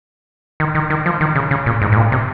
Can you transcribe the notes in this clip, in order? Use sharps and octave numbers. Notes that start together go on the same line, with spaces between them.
D#3
D#3
D#3
F3
D#3
C#3
C#3
A#2
G#2
G#2
A#2
C3